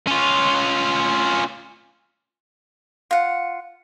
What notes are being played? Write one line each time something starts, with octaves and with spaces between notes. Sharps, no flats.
C#4 F4
F4 F#5